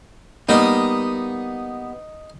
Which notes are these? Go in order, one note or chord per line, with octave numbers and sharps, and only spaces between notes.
G3 A#3 B3 D#4 D#5